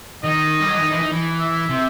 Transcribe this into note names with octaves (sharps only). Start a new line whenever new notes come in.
D#3 D#5
G3
F#3
E3
D#3
E3
D#4
E3
E5
C3